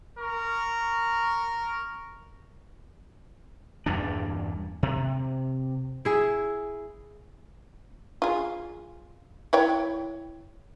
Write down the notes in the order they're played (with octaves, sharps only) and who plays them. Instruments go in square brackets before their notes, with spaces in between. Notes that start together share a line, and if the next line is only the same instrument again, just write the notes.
[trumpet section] A#4 C#6
[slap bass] E2 G2 A#2 D4
C3
[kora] E4 G#4
[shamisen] F4 G#4
E4 C#5 G5